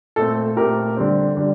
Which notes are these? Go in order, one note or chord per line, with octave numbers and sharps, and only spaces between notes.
A#2 A3 C4 A4
A#2 A3 C4 G4 A#4
D3 G3 C4
D3 G3